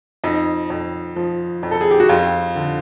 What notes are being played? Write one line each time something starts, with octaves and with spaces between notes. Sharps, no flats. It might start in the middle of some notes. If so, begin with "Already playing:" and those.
F2 D#4
F2
F3
F2
A4
G#4
G4
F#4
F2 F4
D3